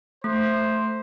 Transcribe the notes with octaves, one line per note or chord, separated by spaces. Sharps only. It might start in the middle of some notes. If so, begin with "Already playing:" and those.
A3 C5